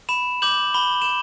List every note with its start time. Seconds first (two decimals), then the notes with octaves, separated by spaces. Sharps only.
0.09 B5 E7
0.42 D6 G6 F#7
0.74 B5 G7
1.02 E7